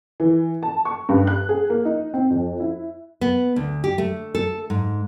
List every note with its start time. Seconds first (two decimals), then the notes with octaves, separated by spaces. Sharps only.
0.20 E3
0.63 A5
0.85 C#6
1.09 G2
1.27 F#6
1.49 G#4
1.70 A#3
1.85 D#4
2.14 C4
2.30 F2
2.60 E4
3.21 B3
3.56 D2
3.84 G4
3.98 A3
4.35 A4
4.70 G#2